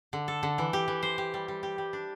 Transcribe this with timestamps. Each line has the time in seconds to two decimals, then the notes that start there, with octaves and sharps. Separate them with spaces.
0.13 D3
0.28 A4
0.43 D3
0.58 E3
0.73 G4
0.88 E3
1.03 C5
1.18 G4
1.34 G3
1.48 G3
1.63 G4
1.78 G3
1.93 D4